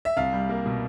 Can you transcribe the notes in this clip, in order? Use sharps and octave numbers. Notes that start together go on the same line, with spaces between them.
E5
C2 F5
G3
A#3
B2